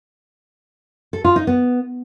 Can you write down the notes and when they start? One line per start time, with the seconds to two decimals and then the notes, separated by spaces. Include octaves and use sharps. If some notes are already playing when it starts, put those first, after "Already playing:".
1.13 A4
1.24 F4
1.36 D#4
1.47 B3